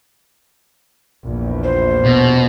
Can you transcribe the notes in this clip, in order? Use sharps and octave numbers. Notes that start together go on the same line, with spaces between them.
A#1 E2
C5
B2